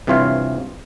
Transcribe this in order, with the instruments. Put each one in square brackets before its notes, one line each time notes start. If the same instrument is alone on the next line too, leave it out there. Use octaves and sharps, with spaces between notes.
[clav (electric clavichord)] G2 C3 E3 F4 C#5 F5